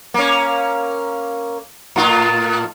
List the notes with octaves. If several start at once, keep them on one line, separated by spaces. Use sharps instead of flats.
A#3 C#4
A2 F4